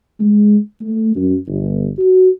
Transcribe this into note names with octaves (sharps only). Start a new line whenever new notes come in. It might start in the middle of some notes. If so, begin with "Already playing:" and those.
G#3
A3
F#2
G1
F#4